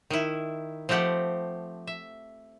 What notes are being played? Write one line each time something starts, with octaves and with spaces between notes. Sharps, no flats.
D#3 E4
F3 A3 C4 G4 F#5
E5